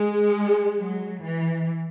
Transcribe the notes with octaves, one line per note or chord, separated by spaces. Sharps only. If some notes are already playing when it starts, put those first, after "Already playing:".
Already playing: G#3
F#3
E3